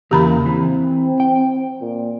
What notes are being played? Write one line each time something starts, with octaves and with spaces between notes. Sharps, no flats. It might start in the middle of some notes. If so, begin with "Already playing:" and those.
E2 C#3 E3 A#3 G4 A#5 B5
E3 C4
G5
A#2